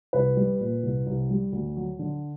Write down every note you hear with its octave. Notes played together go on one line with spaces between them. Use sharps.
C2 B4
G3
A#2
C2
C2
G3
D2
F#3
D3